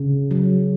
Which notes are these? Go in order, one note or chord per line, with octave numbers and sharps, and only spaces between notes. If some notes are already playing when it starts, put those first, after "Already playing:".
Already playing: C#3
F#3